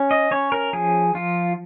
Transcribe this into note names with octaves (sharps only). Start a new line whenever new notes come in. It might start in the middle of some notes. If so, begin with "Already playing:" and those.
Already playing: C#4
D#5
C#4 C#5
A#4
F3 G#4
F3 F4